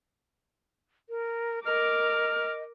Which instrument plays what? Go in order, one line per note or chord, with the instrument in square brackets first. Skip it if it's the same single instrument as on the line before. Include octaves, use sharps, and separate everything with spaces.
[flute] A#4
[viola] A#4 D6 [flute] D#5 [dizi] F6